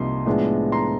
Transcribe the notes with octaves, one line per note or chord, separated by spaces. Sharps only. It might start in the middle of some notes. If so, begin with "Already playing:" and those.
Already playing: C2 C3 F3 A#3 D#4 C6
A2 F3 G#3 B3 D4
A#5 C6